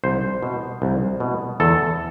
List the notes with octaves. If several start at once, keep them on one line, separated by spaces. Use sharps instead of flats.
C2 C5
B2
C2
B2
E2 A4